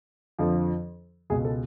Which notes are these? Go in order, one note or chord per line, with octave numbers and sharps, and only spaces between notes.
F2 D3 F3
C#2 B2 G#3 G#4
A4